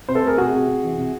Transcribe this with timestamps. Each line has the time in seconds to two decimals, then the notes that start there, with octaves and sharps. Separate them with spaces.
0.08 C3 C5
0.15 A4 B4
0.23 A3 G#4 A#4
0.38 C3 F#4 G#4
0.53 C3
0.67 C3
0.83 E3
0.98 C3